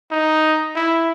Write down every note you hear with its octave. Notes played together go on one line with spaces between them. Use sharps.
D#4
E4